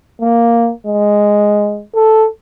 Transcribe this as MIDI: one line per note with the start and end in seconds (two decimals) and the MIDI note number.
0.21 0.71 58
0.86 1.83 56
1.95 2.26 69